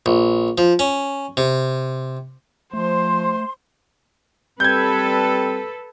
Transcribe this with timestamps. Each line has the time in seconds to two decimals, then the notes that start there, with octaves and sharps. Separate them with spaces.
0.06 A#1
0.58 F3
0.79 C#4
1.37 C3
2.73 F3 A3 C5 C6
4.60 G3 C4 A4 B4 G6 G#6